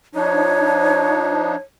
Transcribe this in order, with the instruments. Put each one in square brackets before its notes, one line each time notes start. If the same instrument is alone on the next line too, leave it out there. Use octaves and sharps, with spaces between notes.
[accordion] F3 D4 D#4 [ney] C#5